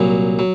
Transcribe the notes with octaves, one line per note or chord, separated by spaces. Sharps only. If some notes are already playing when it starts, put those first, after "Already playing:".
Already playing: C2 A#2 F#3
F#3